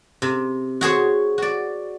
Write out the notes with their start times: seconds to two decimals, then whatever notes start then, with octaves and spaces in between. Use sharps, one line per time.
0.22 C3
0.81 F#4 G#4 C5 C#5
1.38 F#4 D5